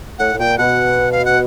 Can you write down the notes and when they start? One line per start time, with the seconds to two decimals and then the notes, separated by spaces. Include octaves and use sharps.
0.19 A2 F#5
0.33 A2
0.39 A#2 G5
0.58 B2 F#5
1.12 F5
1.25 F#5